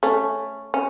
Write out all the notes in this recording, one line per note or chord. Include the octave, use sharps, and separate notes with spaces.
A3 C#4
C#4